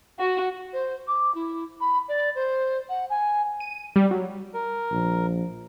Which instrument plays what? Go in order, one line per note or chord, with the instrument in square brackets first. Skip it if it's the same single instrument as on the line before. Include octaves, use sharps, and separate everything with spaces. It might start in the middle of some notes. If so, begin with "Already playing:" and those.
[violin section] F#4
[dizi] C5
D6
E4
B5
D5
C5
F#5
G#5
[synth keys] D#7
G3
F#3
[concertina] A#4
[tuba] A#1